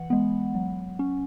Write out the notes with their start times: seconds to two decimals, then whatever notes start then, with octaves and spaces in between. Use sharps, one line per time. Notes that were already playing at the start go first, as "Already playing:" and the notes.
Already playing: E3 F#5
0.10 G#3 B3
0.55 F#3
0.99 C#4